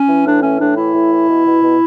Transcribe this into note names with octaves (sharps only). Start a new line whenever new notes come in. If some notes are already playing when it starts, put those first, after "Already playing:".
Already playing: C#4
E3
A2 D4
E3 C#4
A2 D4
E3 E4
A2
E3
B2
B2
B2